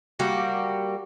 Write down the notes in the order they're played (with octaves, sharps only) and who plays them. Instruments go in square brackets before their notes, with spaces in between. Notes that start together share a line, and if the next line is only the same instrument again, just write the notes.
[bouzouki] G3 A#3 F#4 G4